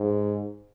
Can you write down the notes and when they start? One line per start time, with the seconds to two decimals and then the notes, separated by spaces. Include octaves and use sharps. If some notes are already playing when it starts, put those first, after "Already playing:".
Already playing: G#2